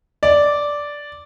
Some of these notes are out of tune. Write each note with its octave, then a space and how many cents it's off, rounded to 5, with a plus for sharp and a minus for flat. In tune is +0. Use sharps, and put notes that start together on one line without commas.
D5 -5